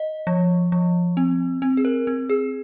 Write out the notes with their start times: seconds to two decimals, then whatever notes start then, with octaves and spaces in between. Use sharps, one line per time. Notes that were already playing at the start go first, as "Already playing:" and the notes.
Already playing: D#5
0.27 F3
0.72 F3
1.17 C4
1.62 C4
1.77 G#4
1.85 A#4
2.07 C4
2.29 G#4